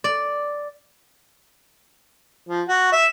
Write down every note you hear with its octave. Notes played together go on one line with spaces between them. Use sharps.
D5
F3
F#4
E5